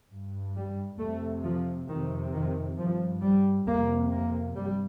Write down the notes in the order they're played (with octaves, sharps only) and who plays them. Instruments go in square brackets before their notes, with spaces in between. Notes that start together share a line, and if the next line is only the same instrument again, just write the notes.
[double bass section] G2
G3
F2 C3 A3
F3
F2 C3 D#3
D#3
G2 F3
G3
F2 C3 A#3
A#3
G2 G3